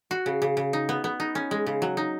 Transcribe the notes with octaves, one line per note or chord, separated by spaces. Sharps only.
F#4
C#3
C#3
C#3
D#4
B3
B3
D#4
C#4
G#3
C#3
F#3
D#4